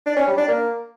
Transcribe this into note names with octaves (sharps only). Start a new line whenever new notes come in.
D4
C#4
G3
D4
A#3